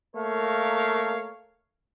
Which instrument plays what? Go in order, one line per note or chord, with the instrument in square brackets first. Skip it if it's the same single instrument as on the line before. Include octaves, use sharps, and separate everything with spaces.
[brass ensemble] A3 A#3 A#4 C#5 F5